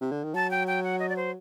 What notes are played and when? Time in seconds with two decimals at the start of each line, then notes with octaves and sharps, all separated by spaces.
0.01 C3
0.12 D3
0.24 D#3
0.34 F#3 A5
0.51 G5
0.67 G5
0.84 F#5
0.99 D#5
1.09 D5
1.16 C5